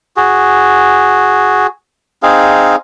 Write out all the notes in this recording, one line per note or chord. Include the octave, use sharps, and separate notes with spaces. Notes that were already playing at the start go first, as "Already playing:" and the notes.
F#4 G#4
C4 D#4 G#4 F5